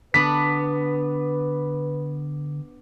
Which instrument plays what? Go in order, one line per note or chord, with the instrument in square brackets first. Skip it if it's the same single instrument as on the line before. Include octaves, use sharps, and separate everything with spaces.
[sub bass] D3 [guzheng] B3 D4 [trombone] B4 [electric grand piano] B6